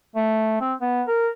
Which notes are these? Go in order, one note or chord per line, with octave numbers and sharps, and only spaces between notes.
A3
C4
B3
A#4